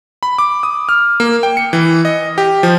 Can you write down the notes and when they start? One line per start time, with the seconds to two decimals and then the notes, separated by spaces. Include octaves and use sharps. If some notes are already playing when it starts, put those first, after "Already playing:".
0.23 B5
0.38 D6
0.63 D#6
0.89 F6
1.20 A#3
1.43 G5
1.57 C#7
1.73 E3
2.05 D#5
2.38 G4
2.63 F3